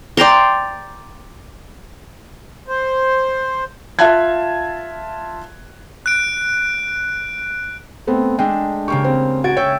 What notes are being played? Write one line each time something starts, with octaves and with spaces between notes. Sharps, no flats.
D5 G5 A#5 C6
C5
F4 E5 F5 A5 F#6 G#6
F#6 D7
A3 B3 C4
G#3 A3 D4 G5
C#3 A#3 G4 C#6
C4
F#4 G#6 A6 D7
C#5 E5 G5